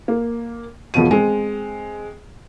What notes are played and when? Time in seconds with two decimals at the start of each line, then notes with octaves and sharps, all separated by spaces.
0.08 A#3
0.94 E1 B2 F3 D#7
1.11 G#3 C4